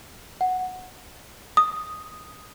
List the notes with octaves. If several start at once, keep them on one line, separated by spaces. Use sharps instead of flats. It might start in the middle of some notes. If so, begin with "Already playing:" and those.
F#5
D#6